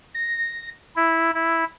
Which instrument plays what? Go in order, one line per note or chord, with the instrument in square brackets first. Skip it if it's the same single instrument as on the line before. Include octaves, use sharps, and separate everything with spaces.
[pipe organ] A#6
E4
E4